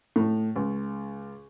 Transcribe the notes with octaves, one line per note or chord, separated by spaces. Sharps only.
A2
C#2